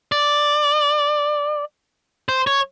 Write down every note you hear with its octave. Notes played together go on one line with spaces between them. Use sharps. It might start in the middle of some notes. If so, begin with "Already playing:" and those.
D5
C5
C#5